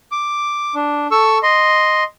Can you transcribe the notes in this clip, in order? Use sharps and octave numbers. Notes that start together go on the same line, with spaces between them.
D6
D4
A4 C#6 E6
D#5 C6